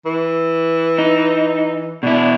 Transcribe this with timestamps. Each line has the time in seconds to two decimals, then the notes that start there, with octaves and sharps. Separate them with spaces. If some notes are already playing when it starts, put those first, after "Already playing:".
0.06 E3
0.98 D#4
2.03 B2 D4 E4